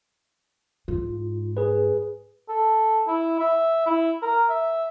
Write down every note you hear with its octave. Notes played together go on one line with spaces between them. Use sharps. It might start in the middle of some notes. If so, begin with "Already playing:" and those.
G#2 F4
G#4 B4
A4
E4
E5
E4
A#4
E5